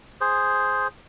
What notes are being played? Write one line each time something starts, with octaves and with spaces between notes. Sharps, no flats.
G#4 C5